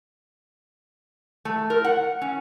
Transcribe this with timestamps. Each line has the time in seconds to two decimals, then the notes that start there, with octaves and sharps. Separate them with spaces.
1.45 A3
1.70 A#4
1.85 F#5
2.22 C#4